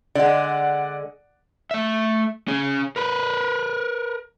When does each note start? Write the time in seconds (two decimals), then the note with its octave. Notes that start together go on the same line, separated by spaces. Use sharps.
0.15 D3 G#3 D5 F#5
1.71 A3 E5
2.48 C#4 G#4
2.96 A#4 B4